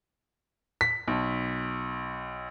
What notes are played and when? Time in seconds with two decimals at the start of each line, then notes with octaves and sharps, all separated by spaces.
0.81 B6
1.08 B1